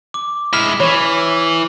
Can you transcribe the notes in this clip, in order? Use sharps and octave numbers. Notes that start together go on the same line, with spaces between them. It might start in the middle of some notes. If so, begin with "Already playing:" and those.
D6
G#3 E4 F6 B6
E3 C#5